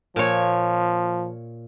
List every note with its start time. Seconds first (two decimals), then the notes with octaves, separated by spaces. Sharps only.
0.16 A#2 F3 C#5